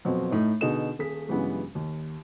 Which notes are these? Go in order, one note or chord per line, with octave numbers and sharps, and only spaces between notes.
F2 B2 F3 F#3
A2 A3 D#4
B2 D3 D#4 G#4 E7
D#1 G#4 B6
G2 C#3 E3 F#3 G#3 B3
D#2